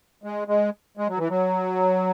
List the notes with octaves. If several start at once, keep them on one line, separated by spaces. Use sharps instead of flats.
G#3
G#3
G#3
F#3
E3
F#3